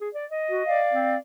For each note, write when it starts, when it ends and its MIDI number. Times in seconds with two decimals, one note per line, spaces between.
0.01 0.09 68
0.14 0.26 74
0.30 0.80 75
0.49 0.64 66
0.66 1.17 74
0.66 1.17 77
0.93 1.16 60